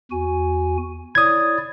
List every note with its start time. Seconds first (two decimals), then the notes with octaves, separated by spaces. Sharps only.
0.11 E2 F#4 G#5
1.15 E4 C#5 D5 D#6 G#6